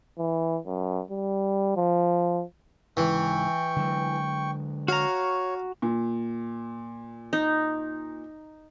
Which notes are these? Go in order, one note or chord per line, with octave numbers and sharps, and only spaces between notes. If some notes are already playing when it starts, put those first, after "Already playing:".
E3
F#2
G3
F3
C#2 G#2 E3 G5 C#6
D3 F#3 G#3
F#4 C#5 F5 A#5
A#2
D#4